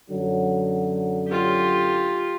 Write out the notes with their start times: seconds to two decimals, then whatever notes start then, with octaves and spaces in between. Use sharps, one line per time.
0.10 F#2 D3 F#3
1.27 F4 G4